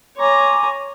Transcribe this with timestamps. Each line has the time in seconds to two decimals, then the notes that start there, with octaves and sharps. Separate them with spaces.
0.17 C#5 G#5 A#5 C6 D6